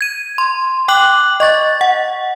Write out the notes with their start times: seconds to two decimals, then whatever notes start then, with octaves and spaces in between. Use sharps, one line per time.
0.01 G#6 D#7
0.38 C6
0.88 G5 D6 F#6 F#7
1.40 D#5 C#6 A6
1.81 F#5